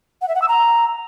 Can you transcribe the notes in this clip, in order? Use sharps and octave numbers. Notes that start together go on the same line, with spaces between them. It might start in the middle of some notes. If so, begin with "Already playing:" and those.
F#5
E5
F#5
E6
A#5